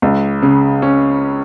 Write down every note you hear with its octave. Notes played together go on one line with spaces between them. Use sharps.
C#2
C#3
C#4